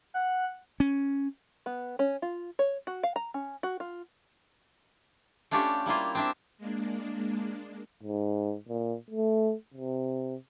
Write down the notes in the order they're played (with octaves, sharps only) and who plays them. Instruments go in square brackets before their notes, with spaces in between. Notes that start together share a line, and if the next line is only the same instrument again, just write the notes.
[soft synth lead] F#5
[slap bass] C#4
[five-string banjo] B3
C#4
F4
C#5
F#4
F5
A#5
C#4
F#4
F4
[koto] A3 C#4 D4 F4 G4
G3 A#3 E4 F4
C4 D4 E5
[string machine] G#3 A#3 D4
[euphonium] G#2
A#2
A3
C3